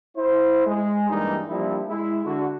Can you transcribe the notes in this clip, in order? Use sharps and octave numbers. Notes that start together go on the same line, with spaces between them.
E4 C5
G#3
G2 E3 G3 G#3 A#3 D#4
F3 G3 A#3 D4 E4
G#3 E4
D3 F#4